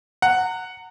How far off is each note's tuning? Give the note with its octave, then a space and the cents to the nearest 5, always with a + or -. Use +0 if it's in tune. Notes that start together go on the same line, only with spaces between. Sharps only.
F#5 +0 A#5 -25